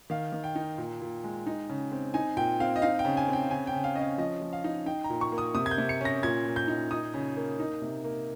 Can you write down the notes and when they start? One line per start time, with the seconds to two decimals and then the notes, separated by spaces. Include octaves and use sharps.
0.10 D#3 F5
0.33 D#3
0.44 G5
0.55 D#4
0.78 A#2
1.02 A#2
1.24 G#3
1.47 D#4
1.70 C#3
1.92 C4
2.14 D#4 G#5
2.37 A#2 G5
2.60 C4 F5
2.76 D#5
2.82 D#4 F5
2.99 G5
3.05 C#3
3.17 G#5
3.28 C4 G5
3.50 C#3 G#5
3.67 G5
3.73 C#3
3.84 F5
3.96 C#4 D#5
4.01 F5
4.18 F3 D#5
4.42 F3
4.53 F5
4.64 D#4
4.86 D#4 G5
5.04 A#5
5.10 A#2
5.21 C#6
5.32 A#3
5.38 D#6
5.55 C3 D#6
5.66 G#6
5.71 G6
5.78 C3
5.89 C#7
6.01 C#4 A#6
6.23 A#2 G#6
6.45 A#2
6.56 G6
6.68 D#4
6.91 D#4 D#6
7.14 C#3
7.37 A#3
7.60 D#4
7.82 C3
8.04 A#3